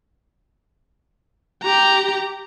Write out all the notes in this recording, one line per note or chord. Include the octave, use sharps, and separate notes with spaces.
G4 A#5